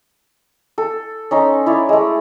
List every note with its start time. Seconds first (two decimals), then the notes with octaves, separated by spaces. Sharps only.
0.78 A4
1.31 C#4 D#4 C6
1.66 E4 C#5 D5
1.89 G#3 A3